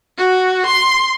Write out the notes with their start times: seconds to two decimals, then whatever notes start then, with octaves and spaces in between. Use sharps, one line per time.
0.18 F#4
0.66 C6